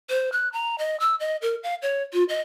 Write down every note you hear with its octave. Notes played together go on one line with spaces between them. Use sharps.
C5
F#6
A#5
D#5
E6
D#5
A#4
F5
C#5
F4
D#5